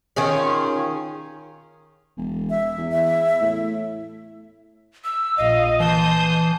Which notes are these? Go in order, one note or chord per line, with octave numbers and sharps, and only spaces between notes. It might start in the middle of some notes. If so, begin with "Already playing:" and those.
D#3 C#4 F4 G#4
E1
E5
E2
E5
A2
E6
A#1 D#5 F5
E3 A5 C6 D#6 G6